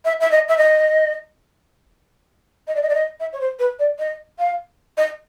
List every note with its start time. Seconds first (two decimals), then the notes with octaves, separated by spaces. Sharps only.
0.05 E5
0.20 E5
0.31 D#5
0.48 E5
0.57 D#5
2.67 D#5
2.75 D5
2.82 D#5
2.89 D5
2.94 D#5
3.20 E5
3.33 C#5
3.40 C5
3.59 B4
3.79 D5
3.99 D#5
4.38 F5
4.97 D#5